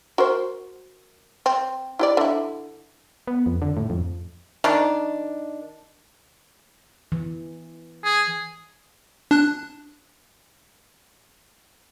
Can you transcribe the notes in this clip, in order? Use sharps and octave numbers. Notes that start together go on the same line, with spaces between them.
F#4 A#4 C5
C4
E4 G4 D5
D3 E4
B3
F2
D3
A2
F2
D#3 D4
E3
G#4
D4 F#6